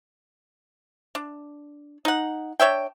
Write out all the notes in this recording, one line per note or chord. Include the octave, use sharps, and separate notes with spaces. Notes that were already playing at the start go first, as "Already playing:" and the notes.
D4
D#4 F#5
D4 C#5 E5 G5